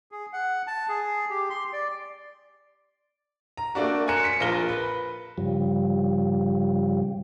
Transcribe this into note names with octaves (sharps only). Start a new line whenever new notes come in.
G#4
F#5
A5
G#4
G4
C6
D5
A#5
A3 A#3 D4 F#4
G#5 A#5 C6 F#6 C#7 E7
B6 C#7
A#1 F4 A#4 A#6 G7
B4
G2 C#3 F3 G3